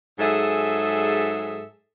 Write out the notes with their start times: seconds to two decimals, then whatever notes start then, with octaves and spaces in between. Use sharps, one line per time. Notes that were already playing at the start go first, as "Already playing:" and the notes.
0.19 G#2 F#3 G#4 A4 E5